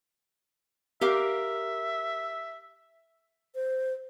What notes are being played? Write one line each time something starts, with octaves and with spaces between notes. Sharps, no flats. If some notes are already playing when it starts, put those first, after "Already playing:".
G4 A#4 E5 F5
C5